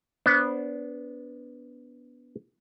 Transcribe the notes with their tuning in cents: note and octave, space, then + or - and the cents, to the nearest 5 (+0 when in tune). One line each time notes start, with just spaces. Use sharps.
B3 -5 D4 -25 C5 +0